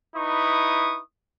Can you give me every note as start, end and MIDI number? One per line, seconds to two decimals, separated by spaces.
0.17 1.00 63
0.17 1.00 64
0.17 1.00 71
0.17 1.00 85
0.17 1.00 87